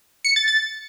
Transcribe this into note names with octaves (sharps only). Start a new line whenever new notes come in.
C#7
A6
A6